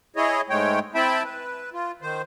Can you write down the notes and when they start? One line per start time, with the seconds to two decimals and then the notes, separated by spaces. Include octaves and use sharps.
0.16 E4 G#4 C#5 D#5
0.50 G#2 G#3 A3 C#5 G5
0.95 C4 E4 E5 G5 A5 B5
1.25 B4
1.73 F4
2.02 D#3 C5